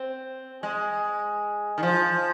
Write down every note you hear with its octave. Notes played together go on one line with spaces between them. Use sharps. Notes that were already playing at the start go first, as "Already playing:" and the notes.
Already playing: C4
G#3
D#3
F3